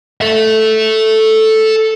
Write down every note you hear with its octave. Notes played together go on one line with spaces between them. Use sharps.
A4 E5